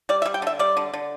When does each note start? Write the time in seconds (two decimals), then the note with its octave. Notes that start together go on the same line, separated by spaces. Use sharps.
0.09 G3 D5
0.22 E5
0.26 G3
0.34 G5
0.42 D3 E5
0.59 G3 D5
0.77 D3
0.94 D3